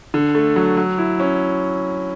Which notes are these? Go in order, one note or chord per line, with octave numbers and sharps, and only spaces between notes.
D3
A3
F#3
F#3
E4
C#4